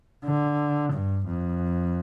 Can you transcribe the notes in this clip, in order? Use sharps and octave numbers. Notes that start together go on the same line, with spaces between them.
D3
G2
F2